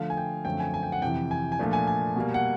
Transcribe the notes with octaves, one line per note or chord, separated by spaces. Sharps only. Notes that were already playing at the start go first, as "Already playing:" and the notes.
Already playing: D3 F3 A3 F5
G#5
G5
F#2 D3 F3 A3 C4 G5
G#5
G#5
G5
F#5
F2 C3 E3 G5
G#5
G#5
A#2 F3 A3 D4
G#5
G#5
B2 G3 A#3
F#5